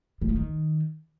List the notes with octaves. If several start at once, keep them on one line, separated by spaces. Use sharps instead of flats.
G3
F3
D#3